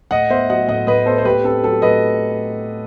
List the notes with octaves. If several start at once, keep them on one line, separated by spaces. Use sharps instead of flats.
A2 D#5 F#5
B3 C5 E5
F#3 D#5 F#5
A2 D#5 F#5
A2 B4 D#5
B3 A4 C5
C5
A2 G4 B4
C4 A4
F#3 A4
A2 B4 D#5